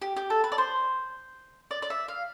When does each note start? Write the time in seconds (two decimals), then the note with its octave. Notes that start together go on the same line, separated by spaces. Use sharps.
0.02 G4
0.17 G4
0.30 A4
0.44 B4
0.52 D5
0.58 C5
1.71 D5
1.82 D5
1.90 E5
2.08 F5